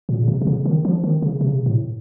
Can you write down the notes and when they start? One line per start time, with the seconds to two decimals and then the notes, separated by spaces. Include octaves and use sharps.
0.09 A#2
0.23 C#3
0.28 C3
0.42 C3
0.47 C#3
0.65 D#3
0.85 F3
1.04 D#3
1.22 C#3
1.41 C3
1.48 C#3
1.55 C3
1.66 A2